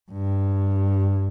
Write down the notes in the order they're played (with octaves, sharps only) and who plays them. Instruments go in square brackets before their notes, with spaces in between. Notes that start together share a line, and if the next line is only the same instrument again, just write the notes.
[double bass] G2